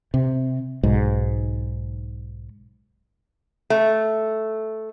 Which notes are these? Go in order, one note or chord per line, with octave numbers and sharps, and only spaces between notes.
C3
B1 G#2
A3